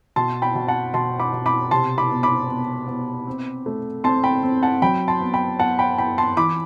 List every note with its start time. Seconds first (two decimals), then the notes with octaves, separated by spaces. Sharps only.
0.16 B2 A5 C6
0.42 G5 B5
0.55 B2
0.68 F#5 A5
0.94 B2 A5 C6
1.19 B5 D6
1.33 B2
1.46 B5 D6
1.71 C3 A5 C6
1.98 B5 D6
2.10 B3
2.23 B5 D6
2.50 B3
2.88 B3
3.27 C4
3.66 A3
4.04 C4 A5 C6
4.24 G5 B5
4.43 C4
4.63 F#5 A5
4.82 F#3 G5 B5
5.08 A5 C6
5.21 B3
5.34 G5 B5
5.59 B3 F#5 A5
5.79 G5 B5
5.98 B3 G5 B5
6.18 A5 C6
6.37 E3 B5 D6